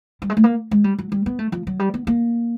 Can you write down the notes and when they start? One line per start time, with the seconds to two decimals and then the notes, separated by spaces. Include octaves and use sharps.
0.22 G3
0.30 G#3
0.37 A3
0.44 A#3
0.71 G#3
0.84 G3
0.98 F#3
1.12 G3
1.26 B3
1.39 A3
1.52 F3
1.67 F#3
1.79 G3
1.94 B3
2.07 A#3